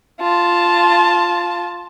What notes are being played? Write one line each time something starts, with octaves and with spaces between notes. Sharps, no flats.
F4 A5